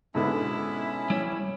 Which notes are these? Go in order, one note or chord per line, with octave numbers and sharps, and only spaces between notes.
G#2 B2 D3 C#4 E4
G3 E4 C#5